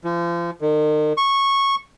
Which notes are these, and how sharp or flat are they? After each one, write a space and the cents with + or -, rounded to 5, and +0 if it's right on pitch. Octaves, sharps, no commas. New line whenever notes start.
F3 -35
D#3 -40
C#6 -10